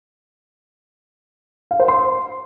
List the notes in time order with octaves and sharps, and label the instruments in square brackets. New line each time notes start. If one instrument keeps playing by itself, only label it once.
[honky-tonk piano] F5
C5
C6